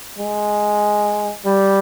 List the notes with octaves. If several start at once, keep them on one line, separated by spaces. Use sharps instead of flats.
G#3
G3